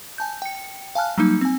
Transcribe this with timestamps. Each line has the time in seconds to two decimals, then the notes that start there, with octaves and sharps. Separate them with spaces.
0.18 G#5 A5 G6
0.42 G5 C#7
0.95 F5 G#5 A5 F6 F#6
1.18 F#3 G3 A#3 D#4
1.41 C4 G#5